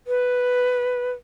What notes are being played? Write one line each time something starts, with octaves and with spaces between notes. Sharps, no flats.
B4